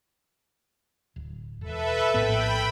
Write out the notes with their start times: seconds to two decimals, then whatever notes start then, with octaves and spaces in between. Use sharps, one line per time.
1.16 D1
1.61 E1 A4 B4 E5
2.14 A#1 A2 B3 G5 B5